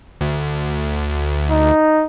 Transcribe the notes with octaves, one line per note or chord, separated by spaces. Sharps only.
D2
D#4